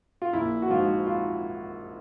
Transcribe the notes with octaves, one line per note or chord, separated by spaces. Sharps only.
F4
A#1 E4
F#4
G#2 F3 F4
F4